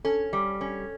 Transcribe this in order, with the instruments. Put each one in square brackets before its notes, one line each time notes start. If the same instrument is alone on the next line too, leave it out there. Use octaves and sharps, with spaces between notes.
[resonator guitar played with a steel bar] C#4 [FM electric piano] A4
[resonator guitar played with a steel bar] G3
C#4